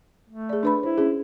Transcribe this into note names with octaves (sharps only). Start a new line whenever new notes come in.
A3
G#4 D5
D4 B4 B5
E4 C5
C#4 G#4